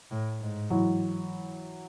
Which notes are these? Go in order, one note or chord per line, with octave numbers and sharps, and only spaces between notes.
A2
G#2
E3 F#3